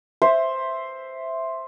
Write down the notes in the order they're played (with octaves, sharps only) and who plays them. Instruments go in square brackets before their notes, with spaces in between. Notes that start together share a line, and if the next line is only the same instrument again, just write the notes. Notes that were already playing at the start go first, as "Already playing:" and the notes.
[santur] C5 E5